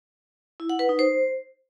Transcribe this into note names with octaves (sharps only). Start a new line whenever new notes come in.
E4
F#5
B4
D#4
C5